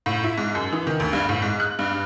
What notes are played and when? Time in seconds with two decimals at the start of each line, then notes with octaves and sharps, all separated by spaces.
0.06 A2
0.24 E4
0.37 G#2
0.55 F#2
0.73 E3
0.87 D#3
1.00 D2
1.13 G2
1.29 A2
1.42 G#2
1.60 F#6
1.79 G2